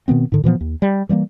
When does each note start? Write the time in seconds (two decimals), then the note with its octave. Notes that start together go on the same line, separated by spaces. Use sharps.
0.08 B2 D#3 B3 C4
0.32 G#2 D3
0.44 A#2 E3 F3 B3
0.61 D#2
0.82 G3
1.09 E3 G3 A3 A#3